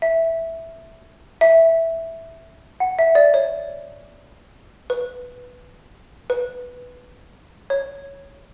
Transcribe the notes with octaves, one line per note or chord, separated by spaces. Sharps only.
E5
E5
F#5
E5
D5
C#5
B4
B4
C#5